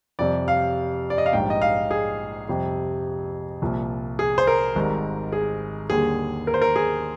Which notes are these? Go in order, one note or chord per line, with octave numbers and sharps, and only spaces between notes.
F2 C3 G3 D5
F5
D5
D#5
F5
A#1 G#2 G3 G5
D#5
F5
G#4
F2 C3 G3
C2 A#2 F3
G#4
C5
A#4
G#1 G#2 G3
G#4
D#2 D3 G3 G#4
A#4
C5
A#4
G#4